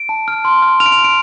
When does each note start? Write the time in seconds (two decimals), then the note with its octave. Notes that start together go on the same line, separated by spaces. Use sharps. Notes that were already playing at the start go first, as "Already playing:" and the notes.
Already playing: D7
0.09 A5
0.28 F6
0.45 C6
0.62 F6
0.80 F6 F7
0.86 D7
0.92 F7
0.98 F6
1.04 D7